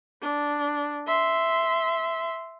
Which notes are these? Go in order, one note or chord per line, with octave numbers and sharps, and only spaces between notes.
D4
E5 C6